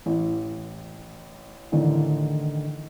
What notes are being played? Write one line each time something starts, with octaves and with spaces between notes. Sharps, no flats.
A1
A1 D3 D#3